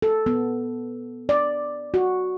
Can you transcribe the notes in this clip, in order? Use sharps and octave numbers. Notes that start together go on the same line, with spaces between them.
A4
B3
D5
F#4